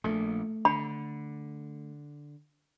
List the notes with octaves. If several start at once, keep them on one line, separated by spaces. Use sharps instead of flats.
A#1 A#2 A3
D3 B5